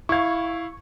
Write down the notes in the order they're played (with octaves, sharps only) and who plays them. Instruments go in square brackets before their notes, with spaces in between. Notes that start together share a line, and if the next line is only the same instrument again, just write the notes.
[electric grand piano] E4 F5 [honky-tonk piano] C#6 G#6